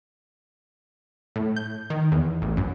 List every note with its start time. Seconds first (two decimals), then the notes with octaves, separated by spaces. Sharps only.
1.36 A2
1.57 G6
1.90 D#3
2.12 E2
2.42 A1
2.57 F#2